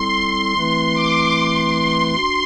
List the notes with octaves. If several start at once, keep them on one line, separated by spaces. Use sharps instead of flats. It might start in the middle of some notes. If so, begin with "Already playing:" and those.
Already playing: G3 C4 E4 A4 C6
E3 A3 C4 E4 B4
D6
C6
C6
D4 F#4 C6